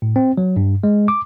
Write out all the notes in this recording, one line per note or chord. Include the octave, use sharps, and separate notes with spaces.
A2
C4
F#3
G2
G#3
D6